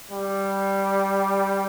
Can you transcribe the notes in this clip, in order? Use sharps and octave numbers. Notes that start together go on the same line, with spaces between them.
G3